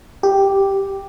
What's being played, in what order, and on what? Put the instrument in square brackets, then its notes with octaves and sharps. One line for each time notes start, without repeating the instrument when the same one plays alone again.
[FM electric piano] G4